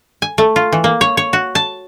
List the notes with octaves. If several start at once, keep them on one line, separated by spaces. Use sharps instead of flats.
G#5
A3
F4
E3
A#3
C#5
C#5
F#4
A5